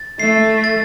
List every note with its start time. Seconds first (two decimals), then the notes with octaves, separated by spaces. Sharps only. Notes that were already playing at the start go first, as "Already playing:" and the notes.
Already playing: A6
0.20 A3 C7
0.64 A6